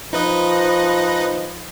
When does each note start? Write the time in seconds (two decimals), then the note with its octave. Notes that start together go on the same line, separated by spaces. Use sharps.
0.13 F3 D#4 B4 D#5